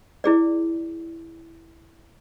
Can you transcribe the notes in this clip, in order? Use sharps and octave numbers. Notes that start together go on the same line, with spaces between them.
E4 G#4 D5